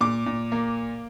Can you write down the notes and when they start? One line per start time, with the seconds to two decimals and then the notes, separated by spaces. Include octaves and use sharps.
0.01 A#2 D6
0.26 A#2
0.52 A#3